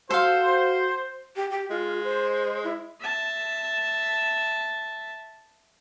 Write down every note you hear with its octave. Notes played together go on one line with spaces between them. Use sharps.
F#4 A4 C5 F5
G4
G4
G#3 F4
C5
E4
E5 A5